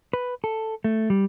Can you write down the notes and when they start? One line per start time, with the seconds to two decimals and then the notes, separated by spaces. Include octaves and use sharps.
0.13 B4
0.44 A4
0.84 A3
1.10 G3